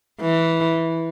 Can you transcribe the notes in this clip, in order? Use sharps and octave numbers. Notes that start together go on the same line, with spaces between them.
E3